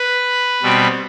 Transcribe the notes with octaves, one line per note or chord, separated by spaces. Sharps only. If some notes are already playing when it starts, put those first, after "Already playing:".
Already playing: B4
B2 G3 C4